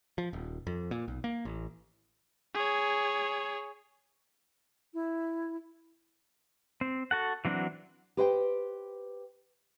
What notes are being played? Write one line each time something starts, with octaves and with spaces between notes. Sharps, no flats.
F3
D#1
F2
A#2
B1
A#3
A1
G#4 C#5
E4
C4
F#4 A4 F#5
E3 F#3 C4 D4 F#4
G4 B4 C5 D#5 F#5 G5